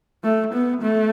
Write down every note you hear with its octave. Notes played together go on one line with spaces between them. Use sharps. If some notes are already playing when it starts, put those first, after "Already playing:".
A3
B3
A3